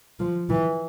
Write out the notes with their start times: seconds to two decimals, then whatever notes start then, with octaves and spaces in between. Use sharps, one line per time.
0.20 F3
0.49 E3